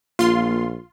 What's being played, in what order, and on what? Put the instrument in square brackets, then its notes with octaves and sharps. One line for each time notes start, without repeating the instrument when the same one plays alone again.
[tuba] A#1 [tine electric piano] A#3 [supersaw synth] F4 C6